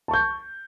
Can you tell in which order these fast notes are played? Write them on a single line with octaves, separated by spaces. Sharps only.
A5 C#6 G6